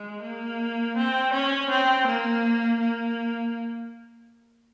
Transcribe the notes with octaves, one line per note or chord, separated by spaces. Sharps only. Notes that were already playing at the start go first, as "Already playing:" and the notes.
Already playing: G#3
A#3
C4
C#4
C4
A#3
A#3